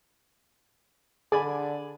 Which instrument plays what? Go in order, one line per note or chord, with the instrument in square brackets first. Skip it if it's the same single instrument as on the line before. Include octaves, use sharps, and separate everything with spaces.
[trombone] D3 [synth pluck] G#4 [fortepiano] D5 G#5 B5